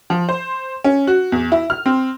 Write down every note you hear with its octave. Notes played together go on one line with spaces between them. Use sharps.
F3
C5
C#4
F#4
E2
E4
F6
C4